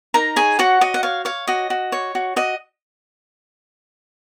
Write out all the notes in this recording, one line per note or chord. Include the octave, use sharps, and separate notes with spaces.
D#4 A#4 A#5
G#4 C#5 G#5
F#4 C#5 F#5
F#4 D#5
F#5
C#5 F5
C#5 F5
F#4 D#5
F#4
C#5
F#4
F#4 D#5